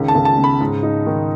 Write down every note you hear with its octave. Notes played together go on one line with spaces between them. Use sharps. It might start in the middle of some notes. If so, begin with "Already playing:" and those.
Already playing: C#2 D#3
A5
C#2
A5
C#3
B5
G#2
D#4
D#3